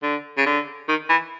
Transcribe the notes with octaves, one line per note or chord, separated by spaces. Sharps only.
D3
C#3
D3
D#3
E3